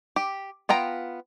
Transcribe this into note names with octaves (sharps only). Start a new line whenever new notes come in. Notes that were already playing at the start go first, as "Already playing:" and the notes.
G4
B3 F4 G5 A#5